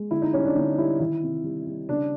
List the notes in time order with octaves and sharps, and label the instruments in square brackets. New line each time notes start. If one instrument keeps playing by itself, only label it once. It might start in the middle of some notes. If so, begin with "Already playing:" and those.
Already playing: [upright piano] G#3
D3 E4
D#4
G3 C#4
D4
D3 D#4
G3 E4
D#3 E4
C3
G3
G3
C#3 D4